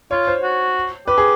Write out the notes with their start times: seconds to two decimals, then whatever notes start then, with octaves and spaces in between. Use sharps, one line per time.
0.11 F4 C#5
0.27 C5
0.43 F#4
1.07 G4 B4
1.18 G#4